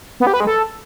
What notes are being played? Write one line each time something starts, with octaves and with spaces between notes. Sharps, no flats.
B3
G4
B4
G#3
A4